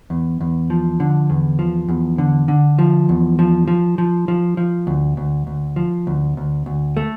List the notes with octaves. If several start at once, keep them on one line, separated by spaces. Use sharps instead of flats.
E2
E2
F3
D3
E2
F3
E2
D3
D3
F3
E2
F3
F3
F3
F3
F3
D2
D2
D2
F3
D2
D2
D2
A3